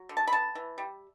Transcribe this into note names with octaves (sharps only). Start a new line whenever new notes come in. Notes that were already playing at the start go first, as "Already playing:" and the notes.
Already playing: F#3
D3
A5
B5
B3 A5
E3
G3